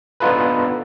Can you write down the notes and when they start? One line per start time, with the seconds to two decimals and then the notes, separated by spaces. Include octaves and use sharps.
0.20 B3 D4 D#4 F4 A4 B4